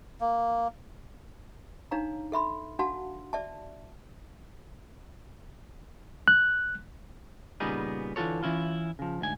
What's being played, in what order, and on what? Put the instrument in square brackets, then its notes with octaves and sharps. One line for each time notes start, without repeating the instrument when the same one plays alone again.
[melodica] A#3
[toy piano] D4 D#4 C#5 F5 A#5
A4 E5 B5 C6
D4 F#4 F5 F#5 A5 C6
D5 E5 A5
[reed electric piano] F#6
[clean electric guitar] A#2 C#3 G3 B3 D#4 G#4
D3 E3 F4 F#4 A4 C#5
E3 C#4 E4 F4
C#3 F3
D2 G#2 G#5